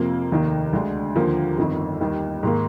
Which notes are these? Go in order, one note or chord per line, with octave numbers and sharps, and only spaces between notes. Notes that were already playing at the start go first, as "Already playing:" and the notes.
Already playing: F2 C3 F3 A#3
F1 D#2 D#3 A#3
D2 D3 G#3 D4
D#2 D3 F3 A#3
G1 F2 D#3
D#2 D#3 G3
G#2 D#3 A#3